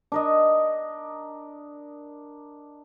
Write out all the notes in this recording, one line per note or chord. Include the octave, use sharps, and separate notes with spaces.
D4 A#4 D#5